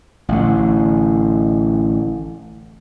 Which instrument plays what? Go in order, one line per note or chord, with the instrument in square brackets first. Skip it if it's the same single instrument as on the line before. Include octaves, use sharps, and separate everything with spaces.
[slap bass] A1 D3